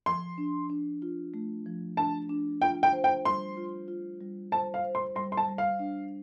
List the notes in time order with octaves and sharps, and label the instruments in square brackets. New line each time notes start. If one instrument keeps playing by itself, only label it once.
[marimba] F3 [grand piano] C6
[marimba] D4
D4
F4
A3
F3
[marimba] D4 [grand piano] A5
[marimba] D4
[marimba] F4 [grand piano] G5
[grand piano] G5
[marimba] C5
[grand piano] G5
[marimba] G3 [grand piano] C6
[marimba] F4
F4
G3
[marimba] C5 [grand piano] A5
[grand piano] F5
[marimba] C5
[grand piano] C6
[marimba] G3 [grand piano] C6
[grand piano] C6
A5
[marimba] G3
[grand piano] F5
[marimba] D4